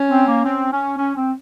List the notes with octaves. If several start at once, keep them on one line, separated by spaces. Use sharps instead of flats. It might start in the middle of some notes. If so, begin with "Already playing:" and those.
Already playing: C#4
C4
A#3
C4
C#4
C#4
C4